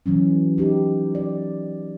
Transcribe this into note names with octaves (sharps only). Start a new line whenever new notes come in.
E3 F#3 C#4
D#4 G4
D5